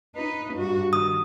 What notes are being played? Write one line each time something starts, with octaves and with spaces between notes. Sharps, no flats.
D#4 B4
G2 F#4
D#3 D#6